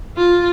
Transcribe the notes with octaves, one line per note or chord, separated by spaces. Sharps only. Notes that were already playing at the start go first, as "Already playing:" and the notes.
F4